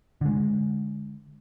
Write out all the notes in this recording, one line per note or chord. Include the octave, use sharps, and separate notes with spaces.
D3 G#3